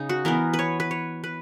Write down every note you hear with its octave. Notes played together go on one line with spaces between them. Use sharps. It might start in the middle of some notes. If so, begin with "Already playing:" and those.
Already playing: C#3 D#4
F#4
E3 B3 A#4
B4
C#5
B4
C#5
B4